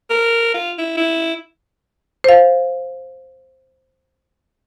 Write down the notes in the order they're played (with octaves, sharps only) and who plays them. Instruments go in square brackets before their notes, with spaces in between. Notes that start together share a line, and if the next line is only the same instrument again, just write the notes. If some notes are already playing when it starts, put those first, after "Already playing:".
[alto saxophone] A#4
F4
E4
E4
[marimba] C5 F5